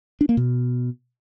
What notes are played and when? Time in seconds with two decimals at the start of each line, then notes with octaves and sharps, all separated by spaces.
0.21 D4
0.29 A#3
0.37 B2